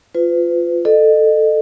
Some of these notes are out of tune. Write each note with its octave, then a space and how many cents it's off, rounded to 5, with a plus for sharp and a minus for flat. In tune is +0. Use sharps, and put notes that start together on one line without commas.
F4 +0 B4 +40
A4 +5 D#5 -30